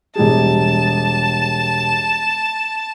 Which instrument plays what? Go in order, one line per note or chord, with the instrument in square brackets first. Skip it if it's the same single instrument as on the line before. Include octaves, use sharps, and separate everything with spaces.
[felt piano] E1 G3 G#4 [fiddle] A5